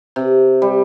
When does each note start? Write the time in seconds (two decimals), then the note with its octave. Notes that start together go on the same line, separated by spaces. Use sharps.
0.16 C3
0.62 G3